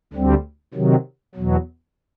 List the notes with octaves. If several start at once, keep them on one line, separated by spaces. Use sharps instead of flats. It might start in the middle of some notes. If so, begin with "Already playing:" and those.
D2 D3 G3 C4
C3 D#3 F#3
E2 B2 F#3